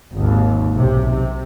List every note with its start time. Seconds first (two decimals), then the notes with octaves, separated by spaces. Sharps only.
0.16 G#1 D#2
0.75 B1 C3
1.06 C3